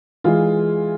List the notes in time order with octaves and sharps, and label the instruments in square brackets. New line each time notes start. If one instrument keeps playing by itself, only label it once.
[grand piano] E3 G#3 F4